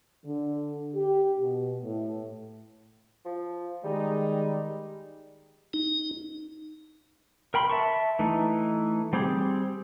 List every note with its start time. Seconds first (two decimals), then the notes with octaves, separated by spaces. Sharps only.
0.25 D3
0.94 G4
1.40 B2
1.83 A2
3.26 F3
3.84 D#3 G3 G#3 D#4
5.74 D#4
7.54 A#4 G5 B5 C6
7.70 E5 A5 C#6
8.19 E3 A3 D#4
9.13 G3 C4 G4 G#4